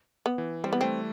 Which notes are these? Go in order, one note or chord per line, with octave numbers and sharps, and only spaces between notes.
B3
E3
G3 C4
B3
A3 C4